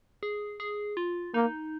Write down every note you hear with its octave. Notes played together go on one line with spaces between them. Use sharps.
G#4
G#4
F4
A#3 D#4